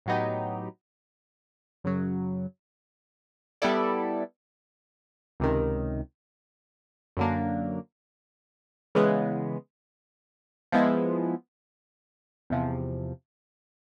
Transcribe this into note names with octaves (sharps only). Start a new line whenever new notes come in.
A2 F#3 B3 D#4 G4
F#2 C#3 F#3
G3 B3 E4 A4 D5
C#2 C3 D#3
F#2 D3 F#3 A#3 D4
C#3 E3 G#3 B3
F3 G#3 B3 E4
E2 C3 F3